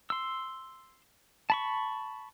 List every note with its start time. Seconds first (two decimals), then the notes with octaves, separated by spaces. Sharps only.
0.10 C6 E6
1.50 A5 B5 C#6